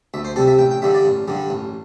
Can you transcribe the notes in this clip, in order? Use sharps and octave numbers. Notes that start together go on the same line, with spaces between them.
D2 E5
C5
C3 G3 A4
E5
A1 G5
G5
G2 D3 G3 E5
D5
A1
G2 D3 G3
A1